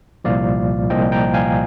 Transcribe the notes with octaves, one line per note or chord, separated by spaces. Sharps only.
C2 A#2 F3 D5 F5
C2 A#2 F3 D#5 G5
G5 A#5
F5 G#5